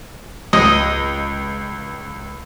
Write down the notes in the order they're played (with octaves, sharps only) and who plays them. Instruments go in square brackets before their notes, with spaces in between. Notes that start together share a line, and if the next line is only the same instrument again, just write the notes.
[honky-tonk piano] C#2 [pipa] D#5